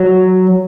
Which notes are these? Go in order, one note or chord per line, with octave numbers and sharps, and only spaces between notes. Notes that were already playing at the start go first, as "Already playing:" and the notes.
Already playing: F#3